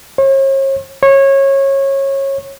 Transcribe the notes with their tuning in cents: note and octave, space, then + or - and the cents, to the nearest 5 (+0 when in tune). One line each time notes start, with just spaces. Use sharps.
C#5 -40
C#5 -20